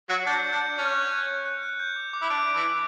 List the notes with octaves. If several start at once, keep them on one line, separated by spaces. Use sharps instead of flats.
F#3 F#4 C#7
D4 G6
G6
D4
G6
C#4 F#6
F#6
F#6
F#6
F#6
F#6
G6
D6
D6
E4
D4 D7
D7
E3 E4
D6